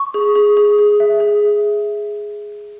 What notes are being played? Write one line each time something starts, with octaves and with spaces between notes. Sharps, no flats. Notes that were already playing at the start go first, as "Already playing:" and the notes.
Already playing: C#6
G#4
G#4
G#4
G#4
E5
G#4